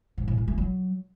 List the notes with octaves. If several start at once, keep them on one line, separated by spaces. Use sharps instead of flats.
G#2
A2
A3
A3
F#3